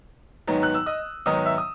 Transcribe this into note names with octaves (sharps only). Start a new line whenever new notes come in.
G#2 D#3 F#3 B3 D#4
F#6
E6
D#5 D#6
G#2 D#3 F#3 B3 D#4 D#5 D#6
E5 E6
D#6